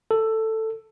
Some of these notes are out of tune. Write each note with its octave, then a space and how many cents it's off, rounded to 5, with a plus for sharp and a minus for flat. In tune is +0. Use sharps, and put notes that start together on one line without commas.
A4 +10